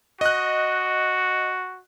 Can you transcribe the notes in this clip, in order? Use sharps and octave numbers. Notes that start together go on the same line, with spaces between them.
F#4 D#5 F#6